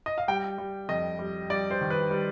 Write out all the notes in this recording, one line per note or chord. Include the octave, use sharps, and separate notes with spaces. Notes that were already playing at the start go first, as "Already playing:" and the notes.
D#5
F5
G3 G5
G3
F2 D#5
G3
G3 D5
C5
D#3
B4
G3